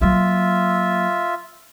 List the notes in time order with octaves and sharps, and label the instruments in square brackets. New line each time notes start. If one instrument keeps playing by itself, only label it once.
[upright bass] F#3 A#3 [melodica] F4 E5